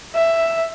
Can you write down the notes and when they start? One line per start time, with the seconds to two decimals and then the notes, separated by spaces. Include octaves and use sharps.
0.15 E5